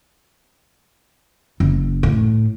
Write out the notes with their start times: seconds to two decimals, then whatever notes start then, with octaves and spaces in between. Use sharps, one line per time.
1.60 F#1
2.03 A2